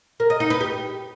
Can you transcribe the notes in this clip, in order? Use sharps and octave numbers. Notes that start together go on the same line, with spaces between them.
A#4
D#5
D#4
B4
G4